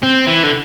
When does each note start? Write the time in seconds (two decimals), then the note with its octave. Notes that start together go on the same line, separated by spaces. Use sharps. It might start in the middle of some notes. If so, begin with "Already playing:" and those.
0.03 C4
0.27 E3
0.44 D3